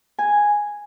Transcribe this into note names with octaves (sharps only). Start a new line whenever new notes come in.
G#5